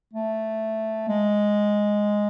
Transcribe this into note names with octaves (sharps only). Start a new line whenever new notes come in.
A3
G#3